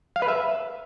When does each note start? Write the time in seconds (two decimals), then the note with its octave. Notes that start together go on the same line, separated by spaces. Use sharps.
0.16 F5
0.22 B4
0.28 E5